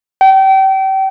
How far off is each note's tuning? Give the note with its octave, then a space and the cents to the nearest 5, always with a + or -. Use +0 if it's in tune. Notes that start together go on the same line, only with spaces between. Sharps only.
G5 -30